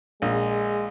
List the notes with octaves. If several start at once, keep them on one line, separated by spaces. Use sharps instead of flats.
A#1 G#3